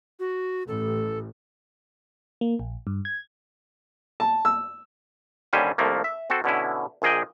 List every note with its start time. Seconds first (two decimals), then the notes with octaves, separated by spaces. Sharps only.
0.20 F#4
0.68 A1 A4
2.41 A#3
2.59 A#1
2.87 G2
3.05 G#6
4.20 A5
4.45 E6
5.53 D#2 D3 G3 C#4 C5 G#5
5.78 C2 F2 F3 A3 A#3
6.04 E5
6.30 C4 F#4 A4
6.44 B2 D3 C#4 E4
7.02 A#1 A#2 G#4 D#5 G5